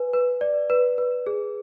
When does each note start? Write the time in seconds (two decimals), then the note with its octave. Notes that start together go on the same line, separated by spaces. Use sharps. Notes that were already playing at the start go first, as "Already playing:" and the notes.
Already playing: B4 G#5
0.13 B4
0.41 D5
0.70 B4
0.98 B4
1.27 G#4